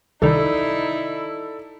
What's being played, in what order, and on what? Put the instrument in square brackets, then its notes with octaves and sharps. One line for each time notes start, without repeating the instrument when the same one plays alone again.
[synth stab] C2 D#3 [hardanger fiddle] D#4 E4 [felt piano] A4 D5